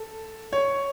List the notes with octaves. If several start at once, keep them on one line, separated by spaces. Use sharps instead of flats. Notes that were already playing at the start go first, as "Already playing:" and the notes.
Already playing: A4
C#5